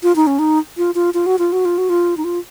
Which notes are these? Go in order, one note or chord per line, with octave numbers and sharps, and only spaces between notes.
F4
D#4
C#4
D#4
F4
F4
F4
F#4
F4
F#4
F4
F#4
F4
D#4
F4